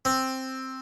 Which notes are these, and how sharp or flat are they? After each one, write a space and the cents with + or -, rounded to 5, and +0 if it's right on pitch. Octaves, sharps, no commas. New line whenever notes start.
C4 +5